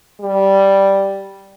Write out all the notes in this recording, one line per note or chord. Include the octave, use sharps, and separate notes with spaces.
G3